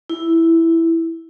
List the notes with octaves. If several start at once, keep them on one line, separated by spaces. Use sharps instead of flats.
E4